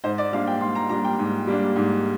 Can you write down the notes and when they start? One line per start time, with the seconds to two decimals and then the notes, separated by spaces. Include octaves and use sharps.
0.04 G#2 C5
0.18 D5
0.33 G3 A#3 D4 F5
0.47 G5
0.61 G#2 C6
0.75 A#5
0.90 G3 A#3 D4 A#5
1.05 G5
1.19 G#2
1.47 G3 A#3 D4
1.76 G#2